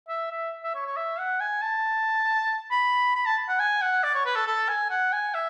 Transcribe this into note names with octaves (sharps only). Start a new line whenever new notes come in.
E5
E5
E5
C#5
C#5
E5
F#5
G#5
A5
B5
B5
A5
F#5
G#5
F#5
D5
C#5
B4
A4
A4
G#5
F#5
G#5
E5